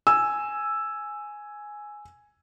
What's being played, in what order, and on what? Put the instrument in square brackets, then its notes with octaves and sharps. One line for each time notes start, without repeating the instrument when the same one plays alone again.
[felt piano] G#5 E6